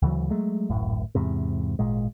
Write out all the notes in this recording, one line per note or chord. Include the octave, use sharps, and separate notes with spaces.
D2 C#3 E3 F#3
F#3 G#3 A3
D1 G#1 F#2 A2
E2 G#2 C3
G#1 A#2 G#3